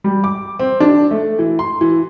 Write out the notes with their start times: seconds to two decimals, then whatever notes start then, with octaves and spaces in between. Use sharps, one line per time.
0.04 G3
0.24 D6
0.59 C4
0.80 D4
1.11 A3
1.39 E3
1.59 C6
1.81 E3